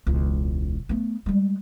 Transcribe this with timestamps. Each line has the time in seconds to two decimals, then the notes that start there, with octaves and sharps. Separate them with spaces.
0.06 E1 C#2
0.89 A3 B3
1.26 G3 G#3